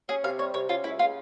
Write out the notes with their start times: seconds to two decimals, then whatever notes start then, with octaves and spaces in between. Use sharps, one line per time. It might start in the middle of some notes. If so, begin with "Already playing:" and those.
0.09 C#4 G#4
0.24 C3 F5
0.39 G3 C#5
0.54 C3 C#5
0.69 C#4 F4
0.84 C#2 E4
0.99 C#3 F4